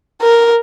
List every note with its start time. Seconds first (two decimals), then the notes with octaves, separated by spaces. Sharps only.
0.22 A#4